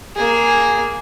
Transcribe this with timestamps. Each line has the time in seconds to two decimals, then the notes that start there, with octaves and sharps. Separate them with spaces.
0.16 A#3 G#4